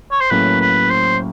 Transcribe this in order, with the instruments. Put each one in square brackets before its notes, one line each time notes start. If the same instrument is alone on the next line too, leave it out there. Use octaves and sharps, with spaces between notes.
[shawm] C#5
C5
[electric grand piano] A2 F#3 A#3 C#4 [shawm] B4
[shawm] B4
C5